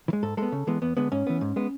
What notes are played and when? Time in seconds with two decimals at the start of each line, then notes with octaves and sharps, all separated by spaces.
0.08 E3
0.13 G#3
0.23 G#2 A4
0.37 G#3 B3 A4
0.52 C#3
0.67 E3 G#3 B3
0.82 E2 B3
0.97 D3 G#3 B3
1.12 G#2 C#4
1.27 E3 B3
1.41 G#2
1.56 G#3 B3